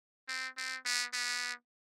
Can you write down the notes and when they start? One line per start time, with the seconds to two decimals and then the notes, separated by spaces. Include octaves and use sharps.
0.28 C4
0.57 C4
0.85 B3
1.13 B3